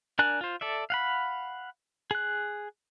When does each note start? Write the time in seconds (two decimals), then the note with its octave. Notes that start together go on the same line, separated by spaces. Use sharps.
0.19 D4 A#4 D5 G#5 F#6
0.41 F4 C5
0.61 A4 D5 E5
0.90 F5 F#5 B5
2.11 G#4 F#6